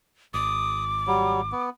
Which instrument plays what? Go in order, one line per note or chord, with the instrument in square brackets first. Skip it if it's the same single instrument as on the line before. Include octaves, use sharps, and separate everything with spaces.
[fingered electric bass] G#1 [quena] D6 [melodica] D#6
[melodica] F#3 G3
B3